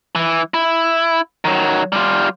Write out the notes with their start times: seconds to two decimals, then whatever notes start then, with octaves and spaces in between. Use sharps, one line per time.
0.15 E3
0.54 E4
1.45 D#3 F#3
1.93 G3 F4